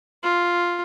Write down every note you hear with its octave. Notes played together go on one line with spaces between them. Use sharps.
F4